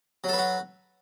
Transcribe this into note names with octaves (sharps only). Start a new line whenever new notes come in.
F#3 F#4 A4 B4